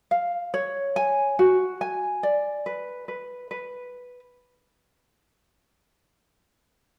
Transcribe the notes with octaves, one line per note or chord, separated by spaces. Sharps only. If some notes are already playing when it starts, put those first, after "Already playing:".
F5
C#5
G#5
F#4
G#5
D5
B4
B4
B4